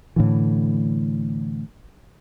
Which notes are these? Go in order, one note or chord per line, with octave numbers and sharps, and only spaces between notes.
A2 D3 E3